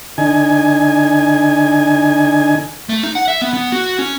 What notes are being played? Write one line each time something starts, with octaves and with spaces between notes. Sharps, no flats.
D3 D#4 G#5
A3
D#4
F#5
E5
B3
B3
F#4
C#4